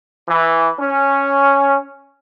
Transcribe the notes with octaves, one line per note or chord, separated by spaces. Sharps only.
E3
C#4